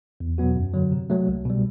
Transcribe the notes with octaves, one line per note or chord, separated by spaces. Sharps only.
E2
B2 F#3 B3 F#4
F#2
D3 F#3
C3
F#3 A3
C2
B2 G3